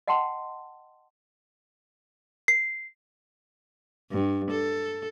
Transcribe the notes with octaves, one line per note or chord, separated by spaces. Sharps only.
D#5 F#5 G5 A5 C6
C7
G2
A4